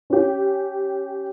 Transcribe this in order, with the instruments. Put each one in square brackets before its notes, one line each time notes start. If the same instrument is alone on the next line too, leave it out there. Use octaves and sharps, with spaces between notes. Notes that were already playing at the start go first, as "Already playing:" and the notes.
[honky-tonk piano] C#4 G4